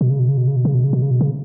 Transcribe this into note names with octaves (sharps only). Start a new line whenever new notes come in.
B2
C#3
B2
C#3
B2
C#3
B2
C#3
B2
C#3
B2
C#3
B2
C#3